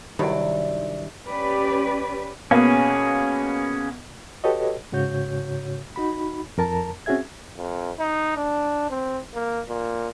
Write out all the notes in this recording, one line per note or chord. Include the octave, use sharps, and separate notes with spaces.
G2 C3 D#3 F#3 E4 D5
C#4 G4 B4 D5
B2 A#3 B3 C#4 G#4
F#4 G4 A4 B4 C#5 D#5
G#2 C#3 F#4 C#5 G6
D#4 F#4 B5
F2 A#4 A5 A#5
C4 C#4 F#4 G#4 E5 G#6
F2
D#4
D4
C4
A#3
A#2